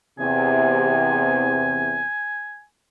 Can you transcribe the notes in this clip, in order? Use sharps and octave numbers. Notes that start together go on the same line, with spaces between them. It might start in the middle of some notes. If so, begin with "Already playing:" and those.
E2 C3 G#5